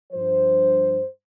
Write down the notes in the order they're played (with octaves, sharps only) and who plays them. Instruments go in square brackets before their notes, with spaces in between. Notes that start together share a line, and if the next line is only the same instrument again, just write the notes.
[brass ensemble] G2 F3 C5